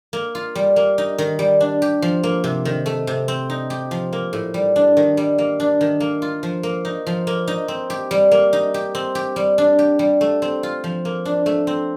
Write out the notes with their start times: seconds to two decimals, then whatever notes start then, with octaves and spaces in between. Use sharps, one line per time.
0.13 A#3
0.35 F4
0.55 G3
0.76 A#3
0.98 D#4
1.18 D#3
1.39 G3
1.61 D4
1.82 G4
2.02 F3
2.23 A#3
2.44 C3
2.65 D#3
2.86 A3
3.07 C3
3.28 C4
3.50 D#4
3.70 G4
3.91 F3
4.13 A#3
4.33 A2
4.54 G3
4.76 D4
4.97 D#3
5.17 G3
5.38 A#3
5.60 D4
5.81 D#3
6.00 A#3
6.22 F4
6.43 F3
6.63 A#3
6.85 D#4
7.07 F3
7.27 A#3
7.48 D#4
7.68 C4
7.90 G4
8.11 G3
8.31 A#3
8.53 D#4
8.74 G4
8.95 C4
9.15 G4
9.36 G3
9.58 D4
9.79 G4
9.99 G3
10.21 A3
10.42 C4
10.63 F4
10.84 F3
11.05 A#3
11.25 D4
11.46 A3
11.67 C4